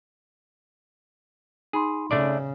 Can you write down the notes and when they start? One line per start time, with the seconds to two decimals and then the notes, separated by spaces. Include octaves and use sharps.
1.73 D#4 G#4 B5 C6
2.11 C#3 A3 D4 D5